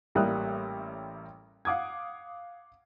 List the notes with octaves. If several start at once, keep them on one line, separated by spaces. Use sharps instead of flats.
A1 G3 A#3 E5 D#6 F#6
F5 F#5 D6 D#6 G#6